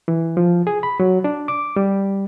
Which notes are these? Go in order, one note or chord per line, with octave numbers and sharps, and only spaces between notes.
E3
F3
G#4
B5
F#3
D4
D6
G3